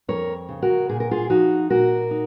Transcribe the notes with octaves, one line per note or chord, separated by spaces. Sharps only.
F2 A#4 C#5
C#3
F#4 A#4
A#2 G#4
A#4
F4 G#4
F3 D#4 F#4
A#2 F#4 A#4
D#4